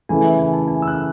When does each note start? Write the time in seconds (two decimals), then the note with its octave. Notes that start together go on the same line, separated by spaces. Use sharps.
0.09 C#3 E3 A3 G#5
0.24 E5
0.39 G#5
0.53 A5
0.68 G#5
0.82 E6
0.87 F#6